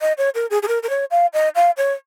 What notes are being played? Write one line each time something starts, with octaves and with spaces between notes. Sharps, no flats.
D#5
C#5
A#4
G#4
G#4
A#4
A#4
C#5
F5
D#5
F5
C#5